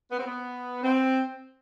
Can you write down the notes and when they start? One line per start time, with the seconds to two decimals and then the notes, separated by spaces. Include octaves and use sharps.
0.11 B3
0.19 C4
0.26 B3
0.83 C4